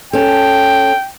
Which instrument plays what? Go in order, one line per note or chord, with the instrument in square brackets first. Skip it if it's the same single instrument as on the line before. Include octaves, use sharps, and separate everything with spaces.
[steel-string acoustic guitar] C#4 A4 [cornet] G5